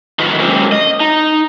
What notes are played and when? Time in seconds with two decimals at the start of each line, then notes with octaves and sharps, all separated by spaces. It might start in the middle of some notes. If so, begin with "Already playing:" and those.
0.19 D#3 F#3 F4 F#4 A#4 B4
0.39 F#3 G#3 A#3 C4 C#4
0.72 D#5
1.00 D#4